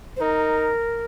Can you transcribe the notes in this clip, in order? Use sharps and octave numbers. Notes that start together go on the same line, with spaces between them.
C5
D#4 A#4